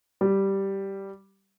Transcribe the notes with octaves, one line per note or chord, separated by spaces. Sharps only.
G3